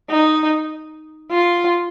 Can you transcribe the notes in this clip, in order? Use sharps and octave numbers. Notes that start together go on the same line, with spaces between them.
D#4
F4